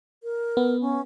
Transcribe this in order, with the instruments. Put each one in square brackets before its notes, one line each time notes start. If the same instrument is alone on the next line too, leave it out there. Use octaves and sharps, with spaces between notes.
[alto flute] A#4
[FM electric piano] B3
[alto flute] C#4